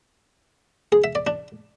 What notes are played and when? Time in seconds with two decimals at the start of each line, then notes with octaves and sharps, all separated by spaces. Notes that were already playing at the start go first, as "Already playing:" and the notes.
0.92 G#4
1.04 E5
1.15 D5
1.27 D4